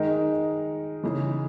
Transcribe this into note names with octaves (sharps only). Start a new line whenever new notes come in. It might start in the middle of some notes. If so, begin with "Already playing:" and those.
Already playing: D#3 G#3 D#4 A#4 D#5
C#3 E3 G#3 D#4 G#4